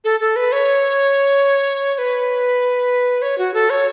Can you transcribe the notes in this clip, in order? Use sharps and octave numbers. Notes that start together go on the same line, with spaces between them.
A4
A4
B4
C#5
C#5
B4
C#5
F#4
A4
C#5